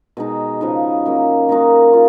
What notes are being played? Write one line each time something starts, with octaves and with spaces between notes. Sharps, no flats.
B2 G#3 D#4
C#3 F3 B3 D#4
F#3 A#3 C#4
D#3 A#3 D#4 F#4
F4